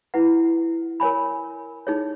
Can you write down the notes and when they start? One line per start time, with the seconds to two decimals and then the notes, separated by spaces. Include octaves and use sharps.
0.14 E4 B4 F#5
1.00 A#4 C#5 G#5 B5
1.87 D#4 G#4 C#5